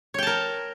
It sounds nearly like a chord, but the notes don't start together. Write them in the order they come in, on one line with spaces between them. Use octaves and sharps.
C#5 G5 A5 A#4